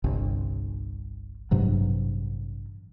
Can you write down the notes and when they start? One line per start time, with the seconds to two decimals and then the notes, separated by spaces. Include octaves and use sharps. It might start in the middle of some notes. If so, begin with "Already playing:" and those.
0.04 G1 C2
1.51 A1 G2 C3 F#3